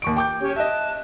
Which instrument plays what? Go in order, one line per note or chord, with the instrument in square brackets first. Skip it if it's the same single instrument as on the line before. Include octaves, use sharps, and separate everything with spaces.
[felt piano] D#2 C#6 D7
G5 D6 G6
[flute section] C#4 G4 C#5
[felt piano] D#5 E5 [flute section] A5 F#6